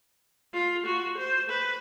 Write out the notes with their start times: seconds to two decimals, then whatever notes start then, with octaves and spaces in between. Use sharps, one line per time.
0.54 F4
0.86 F#4
1.18 C5
1.49 B4